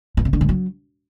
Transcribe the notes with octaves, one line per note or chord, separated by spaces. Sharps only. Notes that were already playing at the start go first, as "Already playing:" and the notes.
A#2
C3
D3
G#2
F#3